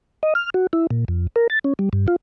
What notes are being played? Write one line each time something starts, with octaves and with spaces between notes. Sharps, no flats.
D#5
F6
F#4
E4
A#2
F2
A#4
A6
C#4
G3
G2
F4